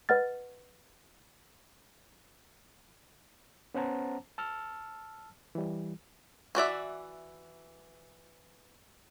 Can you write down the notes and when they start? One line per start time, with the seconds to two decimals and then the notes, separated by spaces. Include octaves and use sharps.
0.09 B4 D#5 F#5 F6 A6
3.74 B3 C#4 C5 F#5 A5 A#5
4.38 A5 E6 F6
5.55 E3 G3
6.55 E3 F#4 D5 E5